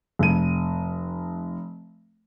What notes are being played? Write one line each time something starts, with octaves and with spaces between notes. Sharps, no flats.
F1 D#7